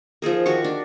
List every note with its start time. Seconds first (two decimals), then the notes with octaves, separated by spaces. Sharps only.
0.22 F3 D#4 G#4 A#4
0.46 D#3 F#4 G4 C#6
0.64 D4